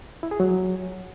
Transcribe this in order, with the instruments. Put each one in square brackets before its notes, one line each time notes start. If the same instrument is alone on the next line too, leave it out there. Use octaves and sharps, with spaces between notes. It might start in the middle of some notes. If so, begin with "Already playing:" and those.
[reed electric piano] E4
G#4
F#3